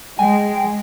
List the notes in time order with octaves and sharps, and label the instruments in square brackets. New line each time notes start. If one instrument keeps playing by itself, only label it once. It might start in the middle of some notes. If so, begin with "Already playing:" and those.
[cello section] G#3 [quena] G5 [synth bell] G#5